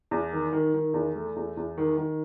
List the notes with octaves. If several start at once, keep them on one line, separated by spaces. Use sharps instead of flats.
E2
D#3
D#3
D#3
E2
A3
E2
E2
D#3
D#3